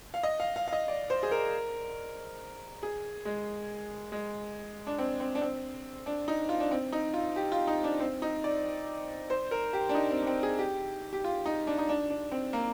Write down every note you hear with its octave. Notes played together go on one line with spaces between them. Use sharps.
F5
D#5
F5
F5
F5
D#5
D5
C5
G#4
A#4
G#4
G#3
G#3
D4
C4
C4
D4
C4
D4
D#4
F4
D4
C4
D#4
F4
G4
F4
D#4
D4
C4
D#4
D5
C5
A#4
G4
D4
D#4
C4
D4
C4
G#4
G4
G4
F4
D#4
D4
D#4
D4
D4
C4
A#3